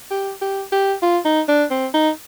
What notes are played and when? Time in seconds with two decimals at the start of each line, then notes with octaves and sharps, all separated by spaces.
0.11 G4
0.41 G4
0.72 G4
1.02 F4
1.25 D#4
1.48 D4
1.71 C4
1.94 D#4